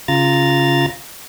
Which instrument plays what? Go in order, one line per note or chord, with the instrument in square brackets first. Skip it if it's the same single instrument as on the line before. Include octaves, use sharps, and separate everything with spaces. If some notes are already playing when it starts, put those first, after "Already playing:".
[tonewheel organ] C#3 F4 A#5 A6